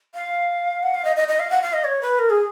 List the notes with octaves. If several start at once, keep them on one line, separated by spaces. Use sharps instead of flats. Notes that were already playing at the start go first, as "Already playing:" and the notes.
F5
F#5
F5
D#5
D#5
D#5
F5
F#5
F5
D#5
C#5
B4
A#4
G#4